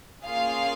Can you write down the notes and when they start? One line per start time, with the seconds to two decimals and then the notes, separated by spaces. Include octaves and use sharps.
0.25 A#3 C#4 F4 G#4 F5